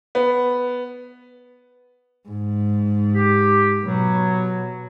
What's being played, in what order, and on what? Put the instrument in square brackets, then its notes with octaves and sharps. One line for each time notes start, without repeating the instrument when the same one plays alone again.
[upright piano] B3
[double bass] G#2
[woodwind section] G4
[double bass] B2 [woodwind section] F#3